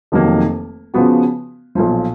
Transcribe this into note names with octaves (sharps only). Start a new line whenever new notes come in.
F1 F2 D#3 F#3 A#3
C#3 F3 B3 F#4
B1 A#2 F3